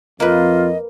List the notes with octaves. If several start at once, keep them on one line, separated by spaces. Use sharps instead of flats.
F2 A#3 F4 B4 D#5